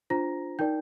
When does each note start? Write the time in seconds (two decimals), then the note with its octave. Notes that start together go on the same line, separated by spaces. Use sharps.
0.10 D4 F4 C5 A#5 A#6
0.59 D#4 A#4 D5 G5 G6